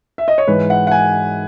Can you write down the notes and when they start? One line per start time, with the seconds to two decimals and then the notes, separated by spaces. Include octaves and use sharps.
0.18 E5
0.28 D#5
0.38 C#5
0.47 G#2 E3 G#3 B4
0.70 F#5
0.87 F#5
0.91 G#5